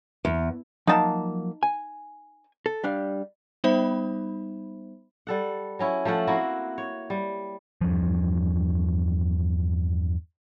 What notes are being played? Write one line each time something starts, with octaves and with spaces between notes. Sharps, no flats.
E2
F3 F#3 A#3 D#4 A5
G#5
A4
G3 D4 F5
G3 B3 D#4 C5 E5 B5
G3 A4 F#5
F#3 C#4 E4
F3 A3 E5 F#5
A#3 C4 E4 F#4
C#5
G3
E2 G2 F3